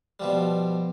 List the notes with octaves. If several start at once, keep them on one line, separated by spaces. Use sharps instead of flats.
B2 F3 G3